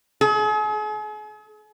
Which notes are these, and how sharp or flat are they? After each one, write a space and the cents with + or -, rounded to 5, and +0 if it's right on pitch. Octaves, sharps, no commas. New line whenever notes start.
G#4 +40